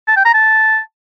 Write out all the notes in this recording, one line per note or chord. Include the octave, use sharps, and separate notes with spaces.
A5
G5
A#5
A5